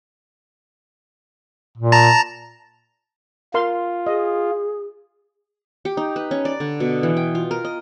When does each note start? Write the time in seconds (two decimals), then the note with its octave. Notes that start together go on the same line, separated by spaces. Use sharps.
1.78 A#2
1.92 A5 A#5
3.54 F4 A#4 F5 C6
4.07 G#4 D#5
5.85 G4
5.97 D#4
6.16 B4
6.31 C#4
6.45 D5
6.60 D3
6.80 B2
7.03 E3
7.17 G5
7.35 F4
7.51 A#4
7.65 D#5